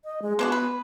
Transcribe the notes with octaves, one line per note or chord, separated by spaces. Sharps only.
D#5
G#3
G#3 B3 D4 F#4
B4